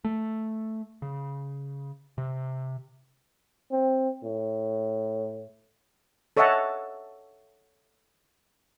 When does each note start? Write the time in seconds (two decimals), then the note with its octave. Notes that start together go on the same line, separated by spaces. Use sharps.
0.04 A3
1.02 C#3
2.18 C3
3.71 C4
4.23 A2
6.37 A4 C#5 D#5 E5 F#5 A5